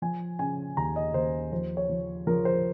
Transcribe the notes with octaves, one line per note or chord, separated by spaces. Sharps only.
F3 G#5
C#3 G#5
D#2 A#5
D#5
D#2 C5
F3 C5
C#5
F3
F3 A#4
C5